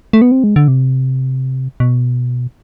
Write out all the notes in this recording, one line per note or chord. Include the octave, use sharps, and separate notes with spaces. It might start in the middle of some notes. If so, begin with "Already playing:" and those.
A3
B3
C4
G#3
D3
C3
B2